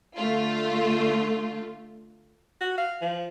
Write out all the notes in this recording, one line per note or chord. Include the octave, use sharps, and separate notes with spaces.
D3 A3 F4
F#4
F5
F3